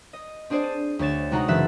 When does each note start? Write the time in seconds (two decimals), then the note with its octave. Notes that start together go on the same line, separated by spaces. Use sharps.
0.13 D#5
0.50 C4 D4 G#4 C5 D5
0.64 D#7
0.99 D2 C#5 A6 E7
1.31 C3 G#3 D#4 F#4 F#5 A#5
1.48 F#1 E3 A4 E5 F#6 A6